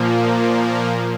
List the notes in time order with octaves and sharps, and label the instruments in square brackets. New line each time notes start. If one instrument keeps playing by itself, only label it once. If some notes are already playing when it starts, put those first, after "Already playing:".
Already playing: [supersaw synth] A#2 F3 A#3